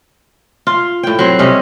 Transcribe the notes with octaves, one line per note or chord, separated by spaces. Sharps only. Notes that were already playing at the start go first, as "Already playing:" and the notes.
F4
A2 G5
F#3 C4
C3 G3 C#4 D#5